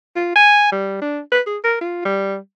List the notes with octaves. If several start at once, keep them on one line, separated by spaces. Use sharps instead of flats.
F4
G#5
G3
D4
B4
G#4
A#4
F4
G3